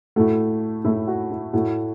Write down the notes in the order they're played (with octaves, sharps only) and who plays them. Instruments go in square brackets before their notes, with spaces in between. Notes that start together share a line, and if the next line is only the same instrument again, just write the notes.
[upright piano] A2 A3 F#4
A2 A3 E4
F#4
E4
A2 A3 F#4